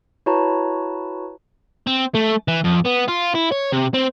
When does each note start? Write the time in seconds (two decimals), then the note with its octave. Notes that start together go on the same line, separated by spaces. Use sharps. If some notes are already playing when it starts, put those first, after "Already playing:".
0.26 E4 F#4 B4 C#5 A5 A#5
1.87 C4
2.15 A3
2.48 E3
2.65 F2
2.86 B3
3.08 F4
3.35 E4
3.52 C#5
3.72 C3
3.94 C4